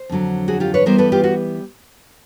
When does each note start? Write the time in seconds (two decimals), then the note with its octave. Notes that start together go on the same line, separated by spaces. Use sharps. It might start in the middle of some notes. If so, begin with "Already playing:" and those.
Already playing: C5
0.10 F2 D3 F#3
0.48 F#4 G#4
0.60 F4 G4
0.74 B4 C#5
0.86 E3 G3 B3 A#4 C5
0.98 A4 B4
1.12 F4 G4
1.24 F#4